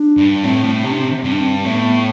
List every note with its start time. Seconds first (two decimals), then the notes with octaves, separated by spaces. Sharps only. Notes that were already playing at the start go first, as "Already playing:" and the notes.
Already playing: D4
0.17 G2
0.43 A2 C4
0.64 A2
0.84 C3 C4
0.92 D4
0.99 C4
1.24 G2 C4
1.32 D4
1.40 C4
1.65 A2 B3 C4